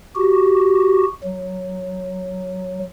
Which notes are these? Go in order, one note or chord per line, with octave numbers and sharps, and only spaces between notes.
F#4 G4
F#3